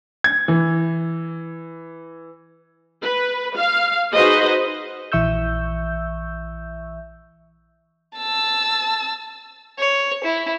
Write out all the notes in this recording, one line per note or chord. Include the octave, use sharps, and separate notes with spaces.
G#6
E3
B4
F5
D#4 F#4 G#4 B4 C5 D#5
A#1 E3 E5 C#6 E6 G6
A5 E6
C#5
E4